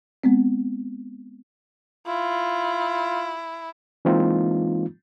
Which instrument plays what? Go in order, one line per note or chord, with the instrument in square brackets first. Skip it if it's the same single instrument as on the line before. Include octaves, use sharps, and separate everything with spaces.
[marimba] G#3 B3 C4
[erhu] E4 [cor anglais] F4
[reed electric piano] E3 G#3 A#3 C4 D#4 F4